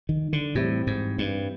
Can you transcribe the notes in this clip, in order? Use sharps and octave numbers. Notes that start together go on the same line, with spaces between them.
D#3
D3
A2 E3 G3 C4 E4 G4
G#2
G2